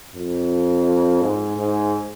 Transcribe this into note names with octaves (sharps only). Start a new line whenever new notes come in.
F2
G#2
G#2